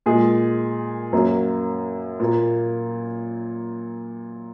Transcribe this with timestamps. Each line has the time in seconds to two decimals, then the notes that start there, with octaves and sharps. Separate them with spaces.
0.06 A#2 G#3 G#4
1.13 F#2 F#3 A#3
2.20 A#2 A#3